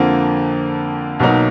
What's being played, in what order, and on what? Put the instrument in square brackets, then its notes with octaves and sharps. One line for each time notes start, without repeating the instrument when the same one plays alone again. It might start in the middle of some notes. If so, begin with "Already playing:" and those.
Already playing: [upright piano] F2 D3 F3 A#3
B1 B2 F#3 A#3 D#4